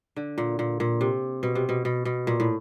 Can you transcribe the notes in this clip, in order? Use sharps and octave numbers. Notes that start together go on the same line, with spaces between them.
D3
A#2
A#2
A#2
C3
B2
C3
B2
B2
B2
A#2
A2